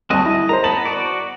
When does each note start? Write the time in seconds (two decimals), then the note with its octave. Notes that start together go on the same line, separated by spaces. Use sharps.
0.10 D2 G3 C4 F#4 D#5 A5
0.26 E4 D#5
0.49 A#4 C5 A#5
0.64 B3 A5 F#7
0.85 F#4 D5